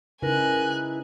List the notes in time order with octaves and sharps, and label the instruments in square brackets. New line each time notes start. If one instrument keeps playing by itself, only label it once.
[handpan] C#3 D#4 [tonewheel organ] E4 B4 [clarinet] A#4 [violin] G#5 F#6